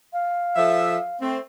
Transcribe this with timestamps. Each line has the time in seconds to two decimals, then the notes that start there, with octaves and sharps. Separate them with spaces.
0.13 F5
0.56 F3 A4 E5
1.20 A3 C4